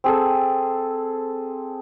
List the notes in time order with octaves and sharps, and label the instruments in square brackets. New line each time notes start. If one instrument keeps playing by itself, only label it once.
[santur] C4 G#4 A4